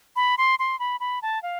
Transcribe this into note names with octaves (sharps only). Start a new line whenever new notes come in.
B5
C6
C6
B5
B5
A5
F5